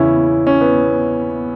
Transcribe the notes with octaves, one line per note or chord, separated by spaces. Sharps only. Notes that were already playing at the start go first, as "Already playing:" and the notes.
Already playing: E2 C#3 E3 C#4 E4
C#4
B3